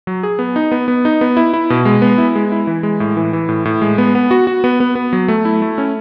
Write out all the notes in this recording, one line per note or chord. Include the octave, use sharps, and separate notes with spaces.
F#3
G#4
B3
D#4
B3
B3
D#4
B3
E4
E4
B2
G#3
B3
E4
G#3
E4
E3
G#3
A2
E3
E3
A2
A2
G#3
B3
B3
F#4
F#4
B3
B3
B3
F#3
A3
E4
A3
C#4